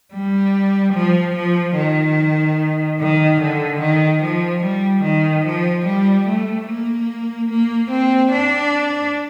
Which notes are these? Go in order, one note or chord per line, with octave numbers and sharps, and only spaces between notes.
G3
F3
F3
D#3
D#3
D3
D#3
F3
G3
D#3
F3
G3
A3
A#3
A#3
C4
D4